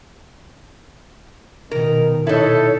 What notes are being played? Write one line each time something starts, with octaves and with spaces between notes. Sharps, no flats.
B2 D#3 A#4
B2 D#4 E4 A4 C#5